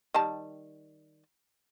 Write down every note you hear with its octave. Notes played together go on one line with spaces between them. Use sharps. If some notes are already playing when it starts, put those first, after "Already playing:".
D#3 G3 A5